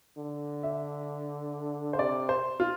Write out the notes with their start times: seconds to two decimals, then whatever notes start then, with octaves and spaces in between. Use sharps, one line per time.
0.18 D3
0.63 E5
1.93 C5
1.99 C3 D5
2.29 C5
2.60 F4